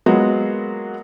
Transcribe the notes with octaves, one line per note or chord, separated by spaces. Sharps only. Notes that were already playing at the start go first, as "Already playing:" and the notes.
F#3 G#3 A#3 B3 F4 F#4